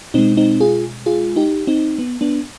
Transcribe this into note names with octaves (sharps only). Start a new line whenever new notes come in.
B2 G#3 C4 D#4
C4 D#4
F4 G#4
F4 G#4
D#4 G4
C4 D#4
B3
B3 D4